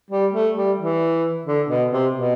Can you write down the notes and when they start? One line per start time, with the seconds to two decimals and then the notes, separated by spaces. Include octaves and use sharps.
0.11 G3
0.34 A3
0.56 G3
0.79 E3
1.46 D3
1.68 B2
1.91 C3
2.13 B2